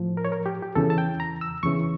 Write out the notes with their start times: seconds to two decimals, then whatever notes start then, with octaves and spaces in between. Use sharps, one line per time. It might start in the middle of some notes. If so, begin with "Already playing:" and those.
Already playing: A2 F3
0.17 A#4
0.25 C#5
0.32 A#4
0.46 G4
0.63 G4
0.75 E2 C#3 E3 A4
0.90 A5
0.98 G5
1.20 A#5
1.41 E6
1.63 E2 C#3 E3 C#6